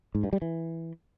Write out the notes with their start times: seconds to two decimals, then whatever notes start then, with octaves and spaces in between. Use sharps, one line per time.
0.15 G#2
0.24 G2
0.33 G3
0.42 E3